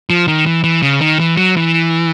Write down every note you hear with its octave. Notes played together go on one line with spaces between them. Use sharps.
F3
D#3
E3
E3
C#3
D#3
E3
F#3
E3